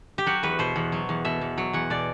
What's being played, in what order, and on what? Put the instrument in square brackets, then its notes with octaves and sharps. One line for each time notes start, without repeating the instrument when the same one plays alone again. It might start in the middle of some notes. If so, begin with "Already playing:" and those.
[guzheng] G4
F#3 F#4
E2 B4
B2 C5
E2
F#3
E2
B2 E5
E2
F#3
E2 F#5
B2 D5